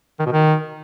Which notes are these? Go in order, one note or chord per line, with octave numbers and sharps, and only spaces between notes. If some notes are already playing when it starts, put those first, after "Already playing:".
D#3
B2
D#3